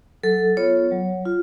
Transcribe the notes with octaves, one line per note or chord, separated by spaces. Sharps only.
F#3 A4
B3 F4 C#5
F#3
F4